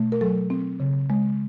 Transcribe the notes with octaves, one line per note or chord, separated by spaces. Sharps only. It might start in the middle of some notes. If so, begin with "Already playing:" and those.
Already playing: B2 A3
A#4
F#3 A4
C4
C#3
G#3